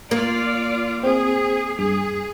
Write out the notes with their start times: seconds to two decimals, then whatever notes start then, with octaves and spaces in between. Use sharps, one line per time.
0.11 A#3 F4 D5
1.03 C4 G#4
1.79 G2 G#4